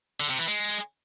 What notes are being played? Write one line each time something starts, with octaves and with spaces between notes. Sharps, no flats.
D3
C3
E3
G#3